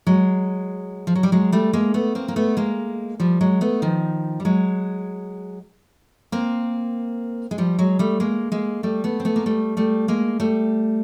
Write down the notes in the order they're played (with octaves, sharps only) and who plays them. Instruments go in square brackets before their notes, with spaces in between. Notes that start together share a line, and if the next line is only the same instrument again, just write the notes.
[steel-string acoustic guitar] F#3 G#3
F3
F#3
G3
F#3 G#3
G3 A3
G#3 A#3
A3 B3
A#3 C4
A#3
A3 B3
G#3 A#3
F3 G3
F#3 G#3
A3 B3
D#3 F3
G3
F#3 G#3
A#3 C4
G#3
F3 G3
F#3 G#3
G3 A3
G#3 A#3
G#3 A#3
G3 A3
A3 B3
C4
A3 B3
A#3
G3 A3
G3 A3
G#3 A#3
G3 A3